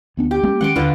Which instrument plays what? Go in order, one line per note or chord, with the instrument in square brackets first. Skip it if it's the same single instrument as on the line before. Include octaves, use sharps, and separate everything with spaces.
[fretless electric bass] D2 B3 D4
[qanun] G4
[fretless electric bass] G#3 A#3 C#4
[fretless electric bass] D#3 G#3 C#4 [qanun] F#5 C6 D6
[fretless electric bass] D#2 [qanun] D3 F4 B4